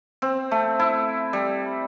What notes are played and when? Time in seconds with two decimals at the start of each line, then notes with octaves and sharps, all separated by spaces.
0.22 C4
0.51 A3
0.79 E4
1.33 G3